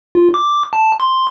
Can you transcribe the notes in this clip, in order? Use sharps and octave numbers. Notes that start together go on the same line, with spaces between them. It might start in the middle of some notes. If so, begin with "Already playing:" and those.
F4
D6
A5
C6